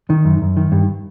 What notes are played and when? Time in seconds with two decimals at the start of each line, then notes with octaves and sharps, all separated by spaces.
0.10 D#3
0.25 F#2
0.42 F#2
0.57 D#3
0.72 G2